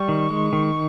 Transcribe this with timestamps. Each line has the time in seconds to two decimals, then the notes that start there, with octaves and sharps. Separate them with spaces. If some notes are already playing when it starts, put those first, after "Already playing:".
Already playing: G3 C#6
0.09 D#3
0.30 G#3
0.53 D#3